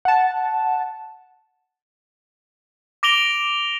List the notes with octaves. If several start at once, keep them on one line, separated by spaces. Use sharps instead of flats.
F#5 A5
D6 A#6 D7 F7 G7